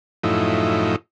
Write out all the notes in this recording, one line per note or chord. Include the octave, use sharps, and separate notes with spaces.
F#2 A2 F3 D#4 E4